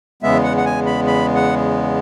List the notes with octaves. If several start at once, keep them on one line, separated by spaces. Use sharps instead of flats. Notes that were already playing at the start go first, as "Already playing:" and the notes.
E2 C#3 G#3 B3 E5
F#5
F#5
G#5
B5
B5
F#5